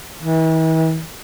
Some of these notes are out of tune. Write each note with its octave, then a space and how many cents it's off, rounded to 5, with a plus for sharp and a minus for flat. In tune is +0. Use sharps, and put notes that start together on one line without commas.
E3 -40